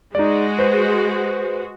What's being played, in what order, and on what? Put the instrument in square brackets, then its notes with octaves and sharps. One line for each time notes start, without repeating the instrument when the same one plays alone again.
[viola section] G#3 F#4 [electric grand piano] D#4 D5
[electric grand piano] B4 C5